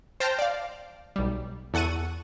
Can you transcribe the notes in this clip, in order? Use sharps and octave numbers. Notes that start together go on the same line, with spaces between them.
C5 G5 A5 F6 G6 A#6
D5 F5
B1 G3
E2 A4 F#5 C#6 D#7